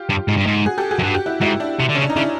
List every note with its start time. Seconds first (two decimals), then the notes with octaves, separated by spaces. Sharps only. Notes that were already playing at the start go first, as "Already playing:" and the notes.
Already playing: F4 G4
0.09 G2
0.28 G#2
0.37 G2
0.46 G#2
0.66 F#4 G#4
0.78 G4 A4
0.91 F#4 G#4
0.99 F#2
1.03 G2 F#4
1.14 G4
1.26 E4 F#4
1.41 G#2 E4 F#4
1.60 D4 E4
1.80 C3
1.89 D3
1.95 C#4
1.98 C#3
2.02 D4
2.10 D#4
2.16 C#3 D4 E4